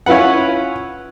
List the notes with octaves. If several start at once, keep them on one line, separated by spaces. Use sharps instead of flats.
C#4 E4 F4 B4 F#5